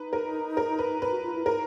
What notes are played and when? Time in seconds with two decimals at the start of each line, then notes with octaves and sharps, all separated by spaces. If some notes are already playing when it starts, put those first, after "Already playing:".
Already playing: D#4 B4
0.13 A#4
0.57 A#4
0.79 B4
1.02 B4
1.10 F#4
1.22 F4
1.34 E4
1.45 D#4 A#4